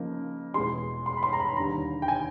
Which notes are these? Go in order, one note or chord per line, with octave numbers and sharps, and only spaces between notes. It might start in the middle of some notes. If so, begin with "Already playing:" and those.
Already playing: C#3 F3 A#3 D#4
E2 B2 G#3 C6
C6
B5
C6
A#5
B5
D#2 D3 G3 A#5
G5
G#5